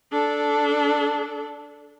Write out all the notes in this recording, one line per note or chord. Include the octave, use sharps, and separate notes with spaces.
D4 A4